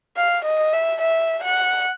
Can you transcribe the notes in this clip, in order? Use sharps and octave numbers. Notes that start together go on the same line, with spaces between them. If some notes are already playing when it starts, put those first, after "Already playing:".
F5
D#5
E5
E5
F#5